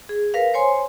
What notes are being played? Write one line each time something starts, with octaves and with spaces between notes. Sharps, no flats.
G#4
A#4 B4 F5
C5 C#5 G#5 C6